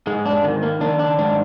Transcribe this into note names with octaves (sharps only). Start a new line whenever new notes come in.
G#2 G#3
D4
D#3
A#3
D#3 D4
D4
G#2 D4